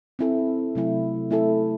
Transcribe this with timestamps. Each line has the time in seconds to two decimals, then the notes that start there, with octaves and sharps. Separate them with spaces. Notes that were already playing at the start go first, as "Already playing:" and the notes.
0.19 C4 E4 A4
0.75 C3 F#3 A3 E4
1.30 A3 E4 A4